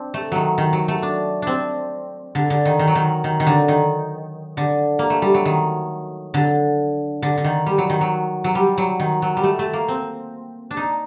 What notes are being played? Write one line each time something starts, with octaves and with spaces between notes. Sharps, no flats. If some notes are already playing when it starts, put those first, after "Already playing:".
Already playing: C4 D4
A3
D#3 F#3
D#3
F#3
A3
D4
C4 D4
D3
D3
D#3
D#3
F#3
D#3
D#3
D#3
D3
D#3
D3
A#3
A3
G3
F#3
D#3
D3
D3
D3
D#3
G3
F#3
D#3
F#3
F#3
G3
F#3
D#3
F#3
G3
A3
A3
A#3
C4
D4
D#4